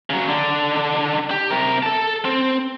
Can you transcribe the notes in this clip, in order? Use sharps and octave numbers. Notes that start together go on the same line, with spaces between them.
C#3 F#3
D3 D4
G4
C3 A#4
A4 A5
C4